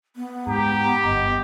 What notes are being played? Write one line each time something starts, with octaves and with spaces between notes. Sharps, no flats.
B3
G#2 G4 A#5
G1 G2 D#5